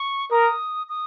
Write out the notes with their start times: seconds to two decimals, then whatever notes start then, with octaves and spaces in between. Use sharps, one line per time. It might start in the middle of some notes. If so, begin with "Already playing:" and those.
Already playing: C#6
0.31 A#4 D#6
0.89 D#6